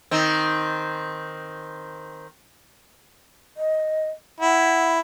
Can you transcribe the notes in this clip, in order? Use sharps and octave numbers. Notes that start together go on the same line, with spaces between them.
D#3 C4
D#5
E4 F#5